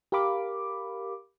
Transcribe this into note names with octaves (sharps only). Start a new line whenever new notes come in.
G4 A#4 F5 B5 D6